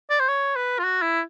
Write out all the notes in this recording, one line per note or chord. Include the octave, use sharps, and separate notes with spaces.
D5
C5
C#5
B4
F4
F#4
E4